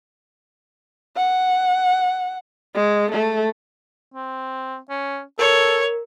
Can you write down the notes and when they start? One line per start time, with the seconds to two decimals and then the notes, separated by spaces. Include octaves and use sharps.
1.16 F#5
2.75 G#3
3.11 A3
4.14 C4
4.90 C#4
5.39 A4 A#4 C#5